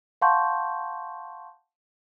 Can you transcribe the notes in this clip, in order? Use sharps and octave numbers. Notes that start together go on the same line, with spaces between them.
F5 F#5 A5 C6 C#6 G6